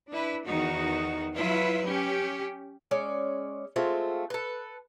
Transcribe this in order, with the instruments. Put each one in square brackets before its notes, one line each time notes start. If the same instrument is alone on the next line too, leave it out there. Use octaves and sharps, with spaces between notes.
[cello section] D4 E4 B4
E2 D#3 D#4 F#4
F#3 E4 F4 B4
C#4 G4
[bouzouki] G#3 C#4 D5
G#3 A3 C4 F4
A4 B4